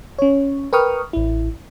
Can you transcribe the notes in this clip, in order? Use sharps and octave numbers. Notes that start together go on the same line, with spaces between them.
C#4 C#5
A#4 B4 G5 C#6 D#6 F6
A1 E4